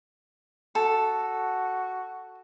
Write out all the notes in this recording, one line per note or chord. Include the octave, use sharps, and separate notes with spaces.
F#4 A4